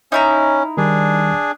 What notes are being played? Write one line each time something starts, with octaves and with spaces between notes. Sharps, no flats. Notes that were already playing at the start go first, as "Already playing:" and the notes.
C#4 D#4 E4 A#5
D#3 G3 D4 G#4